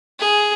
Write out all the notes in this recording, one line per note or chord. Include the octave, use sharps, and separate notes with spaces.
G#4